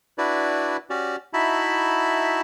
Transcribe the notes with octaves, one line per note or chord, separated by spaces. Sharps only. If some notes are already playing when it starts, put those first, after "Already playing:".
D4 E4 F#4 B4 D5
C#4 F#4 G4 D5
D#4 E4 F#4 E5 A5 B5